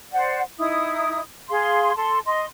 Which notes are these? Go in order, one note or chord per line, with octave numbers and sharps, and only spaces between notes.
C5 D5 F#5
D#4 E4 D#6
G#4 F5 C6
A4 A5 C6
D#5 C6